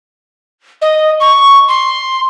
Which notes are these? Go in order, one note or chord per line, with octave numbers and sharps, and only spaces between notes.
D#5
C#6
C6